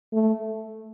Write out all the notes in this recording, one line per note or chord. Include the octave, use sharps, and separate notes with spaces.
A3